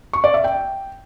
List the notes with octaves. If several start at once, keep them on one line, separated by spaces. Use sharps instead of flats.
C#6
D5
E5
G5